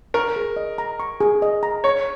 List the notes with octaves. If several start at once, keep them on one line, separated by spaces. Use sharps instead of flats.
A#4 C#6
G#4
D#5
A#5
C#6
G#4
D#5
A#5
C#5 C#6